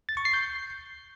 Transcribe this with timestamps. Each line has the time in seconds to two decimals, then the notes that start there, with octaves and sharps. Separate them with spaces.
0.09 A6
0.17 C#6
0.25 C7
0.34 G6